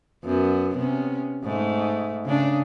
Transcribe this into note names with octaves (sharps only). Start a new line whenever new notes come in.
F#2 B3
C3 B3 C#4
G#2 A3
C#3 D4